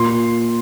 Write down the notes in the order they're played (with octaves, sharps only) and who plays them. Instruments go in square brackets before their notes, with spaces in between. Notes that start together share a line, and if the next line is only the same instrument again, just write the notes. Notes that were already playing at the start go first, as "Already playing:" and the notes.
Already playing: [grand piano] A#2 C6